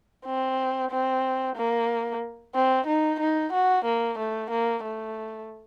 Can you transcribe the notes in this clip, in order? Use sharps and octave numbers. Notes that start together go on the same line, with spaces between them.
C4
C4
A#3
C4
D#4
D#4
F#4
A#3
A3
A#3
A3